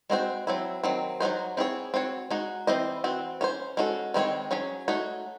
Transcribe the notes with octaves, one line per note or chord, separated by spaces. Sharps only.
G#3 C4 F#4 C5
F#3 C4 E4
D#3 F#3 C4
F#3 A3 D#4 F#4 C5
C4 E4 G#4 C#5
C4 F#4 C#5
G#3 D#4 F#4
E3 C4 E4 C5 D#5
E3 C4 F#4
C#4 F#4 C5
G#3 C#4 F#4 A4
D#3 G#3 C4 F#4 C#5
F#3 C#4 G#4 C#5
A3 D#4 F#4 C#5